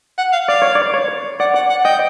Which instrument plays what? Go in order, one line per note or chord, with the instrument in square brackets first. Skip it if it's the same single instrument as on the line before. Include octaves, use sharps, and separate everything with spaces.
[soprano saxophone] F#5
F5
[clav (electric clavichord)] D5 [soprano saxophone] F5
[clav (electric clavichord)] C#5
D5
C#5
[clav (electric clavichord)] D5 [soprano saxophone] F#5
[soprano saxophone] F#5
F#5
[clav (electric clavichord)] D#5 [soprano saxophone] G5